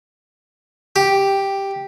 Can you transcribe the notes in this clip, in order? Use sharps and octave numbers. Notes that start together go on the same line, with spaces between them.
G4